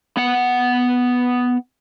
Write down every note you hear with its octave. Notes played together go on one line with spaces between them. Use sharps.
B3 F#5